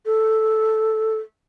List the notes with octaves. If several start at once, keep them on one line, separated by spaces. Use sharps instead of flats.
A4